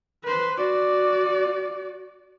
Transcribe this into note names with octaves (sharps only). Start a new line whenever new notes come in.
B4 C5
F#4 D5